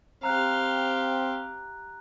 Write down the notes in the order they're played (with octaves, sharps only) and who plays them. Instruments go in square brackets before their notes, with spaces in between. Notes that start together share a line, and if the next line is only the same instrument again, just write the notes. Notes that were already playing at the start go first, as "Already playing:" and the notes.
[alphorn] C4 [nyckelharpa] G4 F5 [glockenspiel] A#5 F#6